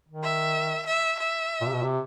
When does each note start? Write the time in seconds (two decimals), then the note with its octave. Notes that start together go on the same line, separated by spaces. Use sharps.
0.08 D#3
0.24 E5
0.87 E5
1.19 E5
1.61 A#2
1.67 C3
1.72 B2
1.83 C3